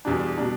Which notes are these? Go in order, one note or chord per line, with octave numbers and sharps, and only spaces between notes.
E2 B2 G3 D4
B2 G3 D4